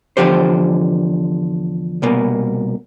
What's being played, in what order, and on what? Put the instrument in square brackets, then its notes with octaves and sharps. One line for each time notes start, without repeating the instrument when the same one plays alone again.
[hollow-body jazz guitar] E2 A#2 D3 F3 G4 C5
C2 B2 A#3